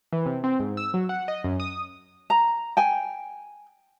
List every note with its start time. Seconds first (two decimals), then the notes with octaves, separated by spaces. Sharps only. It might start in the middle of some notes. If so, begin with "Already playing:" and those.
0.13 E3
0.26 C3
0.44 C4
0.60 G#2
0.77 E6
0.94 F#3
1.09 F#5
1.28 D#5
1.44 F#2
1.60 D#6
2.30 A#5
2.77 G5 G#5